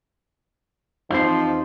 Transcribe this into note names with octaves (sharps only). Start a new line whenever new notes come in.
F2 E3 F3 C4 D#4 G4 C5